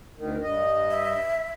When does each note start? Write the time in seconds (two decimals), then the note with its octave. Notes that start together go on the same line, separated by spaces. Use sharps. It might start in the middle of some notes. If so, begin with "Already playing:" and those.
0.17 D2 D#3
0.43 G2 D#5
0.90 E5